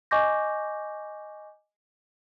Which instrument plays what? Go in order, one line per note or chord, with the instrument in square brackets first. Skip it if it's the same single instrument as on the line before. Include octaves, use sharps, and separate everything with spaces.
[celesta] D#5 G#5 C#6 D6 G6 A#6